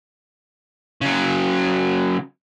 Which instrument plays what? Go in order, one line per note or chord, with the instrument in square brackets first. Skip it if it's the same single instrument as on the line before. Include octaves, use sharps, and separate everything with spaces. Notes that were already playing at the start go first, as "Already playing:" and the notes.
[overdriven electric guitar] C#3 F#3